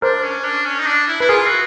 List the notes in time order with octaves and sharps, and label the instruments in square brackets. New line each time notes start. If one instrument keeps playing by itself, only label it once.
[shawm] D4 [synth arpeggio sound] A#4 C5
[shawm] C#4
D4
C#4
D#4
D4
E4
[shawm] E4 [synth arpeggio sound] B4
[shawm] F4 [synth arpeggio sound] G#4 A#4
[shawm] F#4